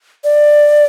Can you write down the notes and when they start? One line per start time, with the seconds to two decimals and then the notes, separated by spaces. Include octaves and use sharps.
0.24 D5